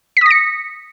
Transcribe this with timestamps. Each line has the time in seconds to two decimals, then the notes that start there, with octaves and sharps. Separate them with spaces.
0.17 B6
0.21 D#6
0.26 A#6
0.30 C#7